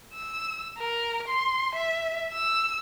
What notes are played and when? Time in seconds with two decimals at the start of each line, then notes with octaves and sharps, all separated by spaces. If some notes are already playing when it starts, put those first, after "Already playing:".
0.14 E6
0.78 A#4
1.28 C6
1.75 E5
2.33 E6